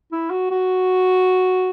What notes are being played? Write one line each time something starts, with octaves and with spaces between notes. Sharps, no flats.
E4
F#4
F#4